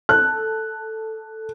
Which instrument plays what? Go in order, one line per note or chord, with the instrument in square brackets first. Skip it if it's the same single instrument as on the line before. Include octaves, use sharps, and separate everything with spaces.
[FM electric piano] A4 [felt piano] F#6